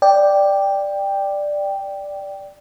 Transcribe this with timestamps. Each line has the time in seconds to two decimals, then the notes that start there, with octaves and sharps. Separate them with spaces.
0.02 D5 G5